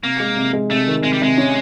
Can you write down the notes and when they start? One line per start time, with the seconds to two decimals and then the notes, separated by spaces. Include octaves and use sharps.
0.03 C3 A#3
0.20 G#3
0.37 C3
0.53 G#3
0.71 C3 A3
0.88 D#3
1.03 C3 G#3
1.13 G3
1.21 C3 G#3
1.38 C#4